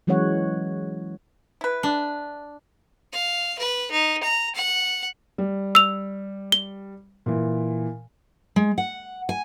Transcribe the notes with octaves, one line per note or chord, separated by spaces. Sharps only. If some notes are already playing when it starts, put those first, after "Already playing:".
E3 F#3 G#3 C#4 C#5 F#5
E4 B4
D4
F5
B4
D#4
A#5
F#5
G3
E6 F7
G7
A#2 E3
G#3
F#5
G#5